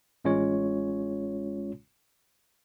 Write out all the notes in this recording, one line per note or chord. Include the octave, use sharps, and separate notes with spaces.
A1 G#3 C#4 F4 C#5